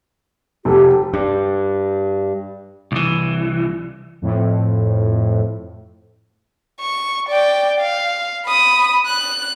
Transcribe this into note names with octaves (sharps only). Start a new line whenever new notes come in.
F1 G4 A4
G2
C2 E3
F2 A2
C#6
D5 G5
F5
B5 D#6
F#6